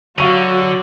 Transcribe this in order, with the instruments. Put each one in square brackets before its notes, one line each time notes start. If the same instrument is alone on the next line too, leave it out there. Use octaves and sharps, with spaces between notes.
[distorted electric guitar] D3 [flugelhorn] F#3 [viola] F#4 [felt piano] F5 C#6 D#7